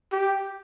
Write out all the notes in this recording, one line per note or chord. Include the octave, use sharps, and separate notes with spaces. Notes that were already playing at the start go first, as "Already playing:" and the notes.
G4